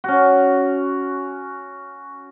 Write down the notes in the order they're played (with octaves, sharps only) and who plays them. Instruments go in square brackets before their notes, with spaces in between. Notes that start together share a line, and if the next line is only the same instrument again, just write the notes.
[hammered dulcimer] C#4 F#4